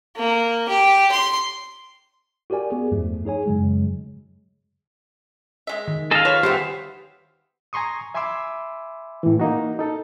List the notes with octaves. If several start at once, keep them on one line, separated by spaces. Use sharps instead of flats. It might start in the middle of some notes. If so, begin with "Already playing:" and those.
A#3
G4
C6
F#4 G4 A#4 D5 G#5
B3 G#4
E2 G2 F3 A3
D#4 G#4 C#5 G#5
F#2 C#3 F#3 G#3
G#3 E5
D#3
G#4 A4 D#5 F5 A5
F4 B4 C#5
F3 G3 B3 G4 C5 E5
G#5 A#5 C6 C#6 D#6
E5 G#5 B5 C6 D6 E6
A2 E3
A#3 D#4 F#4
D#4 A4